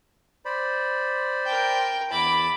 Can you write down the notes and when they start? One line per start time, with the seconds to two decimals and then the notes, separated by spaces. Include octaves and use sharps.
0.45 C5 D5 B5
1.46 A#4 G5
2.11 E2 E4 A5 B5 D6